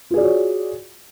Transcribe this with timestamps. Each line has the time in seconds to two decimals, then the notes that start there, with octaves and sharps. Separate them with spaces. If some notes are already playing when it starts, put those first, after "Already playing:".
0.11 F4
0.14 G#4
0.17 D5
0.21 F#4
0.24 C#5